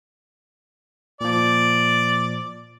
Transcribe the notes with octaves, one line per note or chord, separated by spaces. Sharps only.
A#2 F3 D5